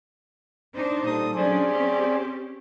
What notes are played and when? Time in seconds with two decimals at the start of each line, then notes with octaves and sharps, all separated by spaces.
0.74 D4 D#4 C5
1.06 A#2 G3 A4 D#6
1.34 F#3 C#4 D4 G#4 C5 D5
1.69 C4 C#4 G4